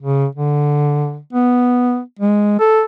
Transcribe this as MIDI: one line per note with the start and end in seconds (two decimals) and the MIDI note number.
0.02 0.26 49
0.35 1.18 50
1.33 2.00 59
2.19 2.58 56
2.60 2.82 69